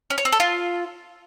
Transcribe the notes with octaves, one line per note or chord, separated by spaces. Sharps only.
C#4
C#5
C4
A4
F4